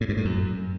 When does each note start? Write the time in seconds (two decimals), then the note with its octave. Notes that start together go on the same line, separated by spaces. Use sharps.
0.01 A2
0.09 G2
0.17 A2
0.25 F#2